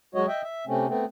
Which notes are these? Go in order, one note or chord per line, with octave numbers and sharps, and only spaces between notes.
F#3 G#3 F#4 C#5 D#5
D#5 E5 G5
E5
C3 A3 C4 C#4
A3 B3 C4